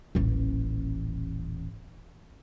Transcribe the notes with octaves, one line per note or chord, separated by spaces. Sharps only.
D#1 A1